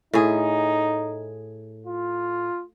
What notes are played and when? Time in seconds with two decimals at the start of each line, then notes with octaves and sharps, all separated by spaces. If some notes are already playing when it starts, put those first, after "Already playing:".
0.13 A2 D#4 G#4
1.86 F4